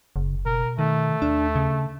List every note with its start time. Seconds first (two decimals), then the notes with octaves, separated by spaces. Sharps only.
0.16 F#1 C#3
0.46 B2 A#4
0.79 D#3 A3
1.22 D#2 D4
1.56 C#3